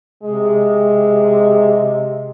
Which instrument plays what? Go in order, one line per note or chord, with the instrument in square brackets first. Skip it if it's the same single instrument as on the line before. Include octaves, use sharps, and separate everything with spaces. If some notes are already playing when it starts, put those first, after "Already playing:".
[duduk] C3 [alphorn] G#3